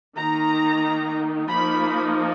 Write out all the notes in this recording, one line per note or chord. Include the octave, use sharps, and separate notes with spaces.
D#3 A#3 D#4 A#5
F3 A#3 D#4 B5